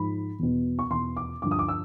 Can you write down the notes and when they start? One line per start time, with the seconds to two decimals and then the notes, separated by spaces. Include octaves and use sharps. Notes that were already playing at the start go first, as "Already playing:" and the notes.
Already playing: G#2 F3 B5
0.39 E2 B2
0.79 C#6
0.90 E2 B2 C6
1.17 D6
1.42 G2 D3 F3 D6
1.51 D#6
1.59 D6
1.68 E6